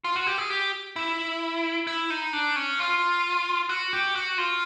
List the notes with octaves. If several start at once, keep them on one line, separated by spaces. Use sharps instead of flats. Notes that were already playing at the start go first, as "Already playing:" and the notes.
F4
F#4
G4
G#4
G4
E4
E4
D#4
D4
C#4
F4
F#4
G4
F#4
F4